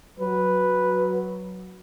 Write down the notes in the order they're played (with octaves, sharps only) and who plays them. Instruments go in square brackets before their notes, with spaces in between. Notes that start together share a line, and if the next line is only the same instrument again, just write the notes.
[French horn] F#3 [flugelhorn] B4